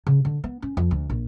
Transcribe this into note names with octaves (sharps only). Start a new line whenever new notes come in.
C#3
D3
B3
C#4
F2
D2
A#1